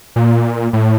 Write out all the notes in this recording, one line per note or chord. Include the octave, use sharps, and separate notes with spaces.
A#2
A2